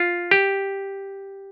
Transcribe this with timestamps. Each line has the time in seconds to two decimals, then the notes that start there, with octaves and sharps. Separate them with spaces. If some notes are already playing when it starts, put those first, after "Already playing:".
Already playing: F4
0.31 G4